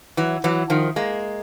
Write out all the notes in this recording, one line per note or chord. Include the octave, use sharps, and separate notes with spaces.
E3 F#3
E3 F#3
D#3 F3
G#3 A#3